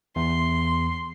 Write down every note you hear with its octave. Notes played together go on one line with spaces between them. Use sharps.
E2 C6